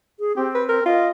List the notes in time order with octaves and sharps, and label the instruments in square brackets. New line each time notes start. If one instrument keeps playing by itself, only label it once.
[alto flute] G#4
[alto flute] C4 [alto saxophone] G4
[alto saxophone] B4
A#4
[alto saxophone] F4 [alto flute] D#5